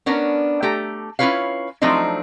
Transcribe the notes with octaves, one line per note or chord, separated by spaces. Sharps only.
B3 C#4 D4 A#4
A3 G4 A4 A#5
C#4 E4 F4 B4 C#5 F5
F3 F#3 A3 C4 D4 D#4